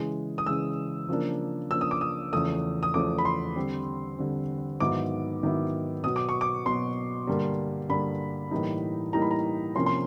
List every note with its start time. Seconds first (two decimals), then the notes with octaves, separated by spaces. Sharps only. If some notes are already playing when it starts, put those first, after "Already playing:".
Already playing: C#3 E3 G#3
0.38 D#6
0.46 C#3 E3 G#3 E6
1.08 C#3 F3 A#3 D4
1.70 C#3 F3 A#3 D4 E6
1.81 D#6
1.91 D6
2.01 D#6
2.32 E2 C#3 F3 A3 D#6
2.83 D#6
2.94 E2 C#3 F3 A3 D6
3.18 B5
3.25 C6
3.56 D3 G3 C4
4.18 D3 G3 C4
4.80 G#2 D#3 F#3 B3 E4 D6
5.43 G#2 D#3 F#3 B3 E4
6.04 B2 F#3 B3 D#6
6.16 D6
6.29 C#6
6.41 D6
6.65 B2 F#3 B3 C6
7.27 G2 D3 G3 A#3
7.89 G2 D3 G3 A#3 B5
8.51 A2 E3 G3 A#3 D#4
9.13 A2 E3 G3 A#3 D#4 A#5
9.22 B5
9.31 A#5
9.75 C3 F3 A#3 C#4 C6
9.86 C6